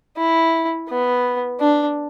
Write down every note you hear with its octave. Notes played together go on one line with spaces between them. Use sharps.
E4
B3
D4